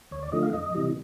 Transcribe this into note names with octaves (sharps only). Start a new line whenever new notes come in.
D2 C#5
D5
D3 F3 A3 D#5
F5
F2 D#5
C3 E3 G3